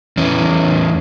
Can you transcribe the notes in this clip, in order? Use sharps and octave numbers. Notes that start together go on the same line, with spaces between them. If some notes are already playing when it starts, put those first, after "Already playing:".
E2 C#4